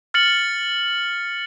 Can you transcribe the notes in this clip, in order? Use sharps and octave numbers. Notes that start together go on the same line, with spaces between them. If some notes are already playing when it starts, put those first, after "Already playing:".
F6 A6 C#7 F#7